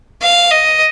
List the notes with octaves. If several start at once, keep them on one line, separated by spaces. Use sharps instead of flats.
F5
D#5